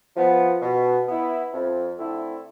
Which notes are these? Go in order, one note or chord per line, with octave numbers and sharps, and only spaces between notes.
F3 B3
B2
B3 E4
F2
D3 A3 C4 E4